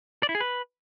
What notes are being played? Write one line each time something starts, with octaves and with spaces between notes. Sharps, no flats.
D5
E4
G#4
B4